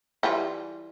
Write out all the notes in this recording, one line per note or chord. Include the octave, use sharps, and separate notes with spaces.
E3 G3 F4